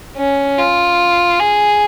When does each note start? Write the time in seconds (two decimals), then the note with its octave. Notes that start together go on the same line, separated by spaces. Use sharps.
0.17 C#4
0.58 F4
1.39 G#4